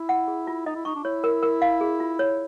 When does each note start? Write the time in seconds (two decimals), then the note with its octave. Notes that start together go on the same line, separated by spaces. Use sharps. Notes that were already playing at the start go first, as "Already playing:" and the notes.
Already playing: E4
0.09 F#5
0.28 G#4
0.47 F4
0.66 D#4 D#5
0.76 E4
0.85 D#4 C#6
0.95 D4
1.04 E4 C#5
1.24 A#4
1.43 A#4
1.62 F5
1.81 G#4
2.00 F4
2.19 C#5